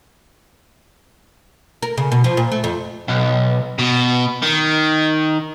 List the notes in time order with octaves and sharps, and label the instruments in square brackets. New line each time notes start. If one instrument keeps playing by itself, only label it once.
[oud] A#4
C#3
B2
F3
A#2
A3
F2
[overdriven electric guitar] B1
B2
D#3